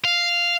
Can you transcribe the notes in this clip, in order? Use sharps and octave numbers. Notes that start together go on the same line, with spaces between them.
F5